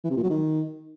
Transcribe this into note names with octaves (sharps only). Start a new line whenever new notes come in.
E3
C3
A#2
F#3
D#3